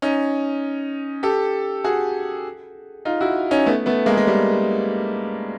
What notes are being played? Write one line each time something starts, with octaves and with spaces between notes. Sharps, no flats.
C#4 D#4
G4 A4
F#4 G#4
D#4 F4
E4 F#4
C#4 D#4
A3 B3
A3 B3
G#3 A#3
G#3
G3